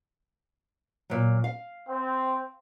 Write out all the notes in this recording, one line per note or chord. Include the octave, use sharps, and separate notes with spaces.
A#2 F#3
F5
C4